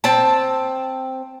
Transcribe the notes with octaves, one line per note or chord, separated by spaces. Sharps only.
C4 G5 A5